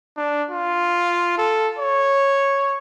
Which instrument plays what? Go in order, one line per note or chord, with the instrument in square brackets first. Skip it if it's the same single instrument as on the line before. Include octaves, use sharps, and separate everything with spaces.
[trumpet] D4
F4
A4
C#5